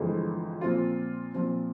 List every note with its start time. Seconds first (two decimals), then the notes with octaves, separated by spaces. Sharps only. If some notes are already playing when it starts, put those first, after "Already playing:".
Already playing: G1 F2 E3 G#3
0.61 A#2 F3 C4 F4
1.34 A#2 F3 C4